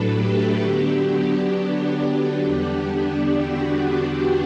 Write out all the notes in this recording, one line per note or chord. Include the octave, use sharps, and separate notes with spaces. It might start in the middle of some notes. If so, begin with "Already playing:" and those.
Already playing: A2 F#3 A3 D4 A4 B4
G4
D3 F#3 B3 D4
G4
E2 D3 G3 B3 D4 G4
F#4